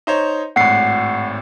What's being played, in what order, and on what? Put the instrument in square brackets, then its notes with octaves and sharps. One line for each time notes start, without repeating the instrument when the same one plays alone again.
[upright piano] D#4 C5 C#5
[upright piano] G#1 A2 [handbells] F#5 C7